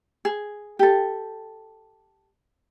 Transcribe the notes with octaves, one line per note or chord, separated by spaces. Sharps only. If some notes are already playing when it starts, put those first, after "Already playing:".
G#4
G4 A4